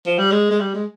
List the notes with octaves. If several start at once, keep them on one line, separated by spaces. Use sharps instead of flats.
F3
G3
G#3
G#3
G3
G#3